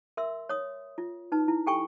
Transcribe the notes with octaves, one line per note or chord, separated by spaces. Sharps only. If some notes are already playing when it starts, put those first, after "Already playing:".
A#4 E5 C6 E6
C#5 D#6
F4
D#4 B4 A5
E4
G4 A4 G5 G#5 C#6